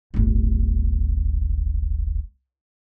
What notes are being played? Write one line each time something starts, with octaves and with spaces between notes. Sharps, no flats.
D1 G1